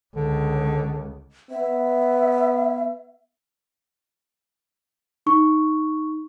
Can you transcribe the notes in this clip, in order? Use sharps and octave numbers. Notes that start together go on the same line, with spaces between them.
C#2 D3
B3 E5
D#4 C#6